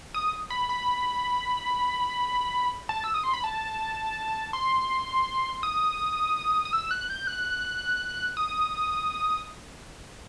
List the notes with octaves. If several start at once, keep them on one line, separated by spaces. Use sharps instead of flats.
D#6
B5
B5
A5
E6
D#6
C6
B5
A5
C6
D#6
D#6
E6
F#6
G6
F#6
D#6